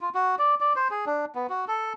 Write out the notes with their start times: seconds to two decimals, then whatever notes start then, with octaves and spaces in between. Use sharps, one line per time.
0.01 F4
0.15 F#4
0.39 D5
0.60 D5
0.76 C5
0.91 G#4
1.06 D4
1.35 B3
1.49 F#4
1.68 A4